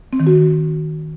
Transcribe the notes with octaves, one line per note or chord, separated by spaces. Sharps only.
C4
D#3
F#4